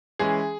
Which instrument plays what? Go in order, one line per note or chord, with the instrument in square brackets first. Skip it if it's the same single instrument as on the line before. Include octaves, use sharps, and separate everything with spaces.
[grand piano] E3 G#3 C#4 G#4